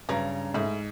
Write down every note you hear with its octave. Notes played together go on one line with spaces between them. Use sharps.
G2 C#3 F#3 B4 A#5
G#2 A3 E4